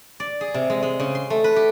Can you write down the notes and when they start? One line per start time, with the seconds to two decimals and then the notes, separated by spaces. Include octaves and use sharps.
0.20 D5
0.41 G#4
0.54 C3
0.70 G#3
0.83 G#3
1.00 C#3
1.15 C6
1.30 A3
1.44 B4
1.56 G4